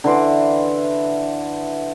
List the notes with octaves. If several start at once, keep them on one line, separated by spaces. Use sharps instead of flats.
D3 E3 C6 D6